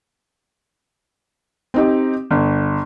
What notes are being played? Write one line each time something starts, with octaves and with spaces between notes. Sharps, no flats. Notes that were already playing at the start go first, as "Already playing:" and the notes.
C4 D#4 G4
G1